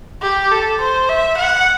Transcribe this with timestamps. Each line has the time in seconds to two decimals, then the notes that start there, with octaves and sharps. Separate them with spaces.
0.22 G4
0.51 A4
0.81 C5
1.09 E5
1.37 F#5